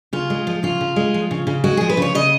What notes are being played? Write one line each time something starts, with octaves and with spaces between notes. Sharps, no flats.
C#3 F4
G#3
F3
C#3 F4
C#3
G#3
F3
C#3
C#3
G#3 F#4
F3 G#4
B4
C#3 C#5
C#3 D#5